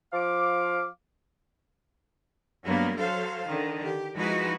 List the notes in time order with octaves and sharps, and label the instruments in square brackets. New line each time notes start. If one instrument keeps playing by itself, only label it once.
[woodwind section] F3 F5 D6
[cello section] G2 F#3 A#3 B3
F#3 A4 C5 F5
D3 D#3
G4
F3 G#3 D#4 E4 F#4 B4